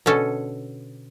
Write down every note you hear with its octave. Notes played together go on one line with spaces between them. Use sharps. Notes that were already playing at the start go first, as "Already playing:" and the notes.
B2 D3 C#4 A4